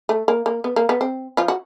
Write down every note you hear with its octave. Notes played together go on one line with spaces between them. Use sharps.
A3
A#3
A#3
B3
A#3
B3
C4
F3 F4
F#4